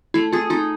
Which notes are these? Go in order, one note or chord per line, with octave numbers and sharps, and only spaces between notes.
A3 E4
F4 G#4
D#4 F4